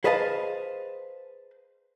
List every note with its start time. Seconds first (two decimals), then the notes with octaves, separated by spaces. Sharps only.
0.04 G#4 B4 C5 D#5 F5 A5